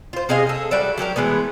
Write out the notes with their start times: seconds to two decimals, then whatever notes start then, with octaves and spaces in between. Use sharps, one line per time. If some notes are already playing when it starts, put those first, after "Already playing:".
0.13 F4 C5
0.29 C3 G#4 D#5 F5
0.47 G#4 A4
0.71 G3 F#4 D5 E5
0.98 F#3 G4 A4 A#4
1.16 E3 G#3 A3 B3